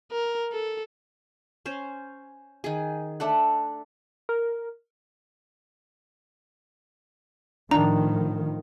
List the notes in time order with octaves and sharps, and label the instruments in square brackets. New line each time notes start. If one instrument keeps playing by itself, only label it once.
[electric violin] A#4
A4
[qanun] C#4 C5
D#3 G#4
A3 D4 A4 F#5
[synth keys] A#4
[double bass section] A2 D#3 F3 [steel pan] D4 [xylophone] A#5